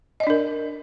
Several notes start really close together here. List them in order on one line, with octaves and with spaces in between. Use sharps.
D#5 D5 D4 A#4